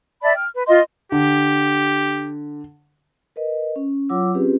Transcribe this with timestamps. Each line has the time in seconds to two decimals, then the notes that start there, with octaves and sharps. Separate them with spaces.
0.22 D5 E5 A5 B5
0.34 G5 F6
0.54 B4
0.68 F4 D#5 C6
1.12 D3 G4
3.36 A#4 B4 D#5
3.76 C#4
4.09 F#3 F4 C#5 F#5 D6 E6
4.34 C4 C#4 F4 G4 G#4 B4